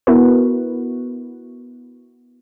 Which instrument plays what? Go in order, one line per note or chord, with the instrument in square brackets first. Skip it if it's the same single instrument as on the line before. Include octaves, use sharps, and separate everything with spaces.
[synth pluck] B3 E4 F#4 A#4 B4